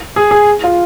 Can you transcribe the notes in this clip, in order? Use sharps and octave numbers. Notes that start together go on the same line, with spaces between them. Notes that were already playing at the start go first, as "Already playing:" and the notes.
G#4
G#4
F4